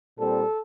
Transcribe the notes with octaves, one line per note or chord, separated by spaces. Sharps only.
A#2 G3 C4 A4